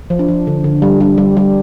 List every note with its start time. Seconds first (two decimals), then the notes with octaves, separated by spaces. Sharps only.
0.10 F3
0.19 D4
0.28 F3
0.47 D3
0.64 D3
0.82 G3
1.00 G3 D4
1.18 G3
1.37 G3